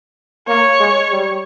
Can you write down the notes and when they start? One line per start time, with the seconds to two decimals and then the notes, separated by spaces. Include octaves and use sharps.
0.48 A#3 C#5
0.80 G#3
1.11 G3